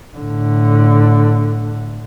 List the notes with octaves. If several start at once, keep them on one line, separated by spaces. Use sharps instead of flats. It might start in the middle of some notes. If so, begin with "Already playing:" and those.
A2 D3